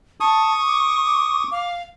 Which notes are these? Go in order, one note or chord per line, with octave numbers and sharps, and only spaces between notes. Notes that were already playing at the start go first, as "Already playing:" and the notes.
A5 C#6 D#6
D6
F5